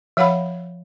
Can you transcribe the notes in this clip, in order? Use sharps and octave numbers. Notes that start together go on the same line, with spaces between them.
F3 C#5 F5 F#5 B5